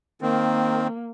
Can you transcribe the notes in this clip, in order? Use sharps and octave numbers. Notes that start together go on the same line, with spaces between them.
D#3 A#3 C4